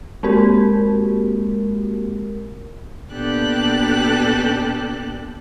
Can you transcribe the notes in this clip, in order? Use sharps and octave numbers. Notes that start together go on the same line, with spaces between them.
G#3 A#3 C4 F#4 G4 A#4
A#2 B3 D4 G4 A4 F#6